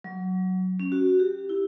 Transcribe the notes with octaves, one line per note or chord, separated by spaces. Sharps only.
F#3
C#4
F#4
G4
E4